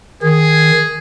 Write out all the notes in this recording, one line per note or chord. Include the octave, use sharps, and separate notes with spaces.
D#3 G#4